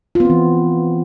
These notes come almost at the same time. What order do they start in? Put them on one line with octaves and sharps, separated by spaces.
F4 B3 C4 E3